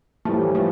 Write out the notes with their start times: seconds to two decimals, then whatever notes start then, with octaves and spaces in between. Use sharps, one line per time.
0.25 A2 E3 F3 G3 A3
0.55 F3 A3